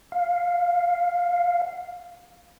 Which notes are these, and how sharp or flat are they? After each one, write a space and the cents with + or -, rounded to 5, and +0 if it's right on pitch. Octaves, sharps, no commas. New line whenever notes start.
F5 +10